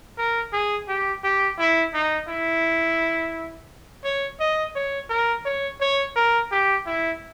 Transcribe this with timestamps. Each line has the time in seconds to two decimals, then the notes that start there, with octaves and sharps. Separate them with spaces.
0.18 A#4
0.53 G#4
0.88 G4
1.24 G4
1.59 E4
1.94 D#4
2.28 E4
4.04 C#5
4.40 D#5
4.76 C#5
5.10 A#4
5.46 C#5
5.81 C#5
6.16 A#4
6.51 G4
6.86 E4